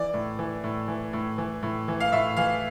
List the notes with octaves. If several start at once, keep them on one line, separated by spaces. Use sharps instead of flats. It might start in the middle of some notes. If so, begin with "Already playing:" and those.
Already playing: E3 D5
A2
E3
A2
E3
A2
E3
A2
E3
F5
A2 E5
E3 F5